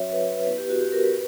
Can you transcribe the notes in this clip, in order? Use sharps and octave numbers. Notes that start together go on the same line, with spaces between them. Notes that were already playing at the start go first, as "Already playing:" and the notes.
Already playing: F#3 C#4 F#4 C#5 E5
B4
B4
B3 E4 B4
G4
F#4
G4
A#4
B4